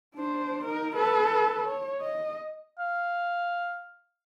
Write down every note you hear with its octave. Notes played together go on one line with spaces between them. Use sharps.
D4 C5
D#4 A#4
A4 B4
C#5
D#5
F5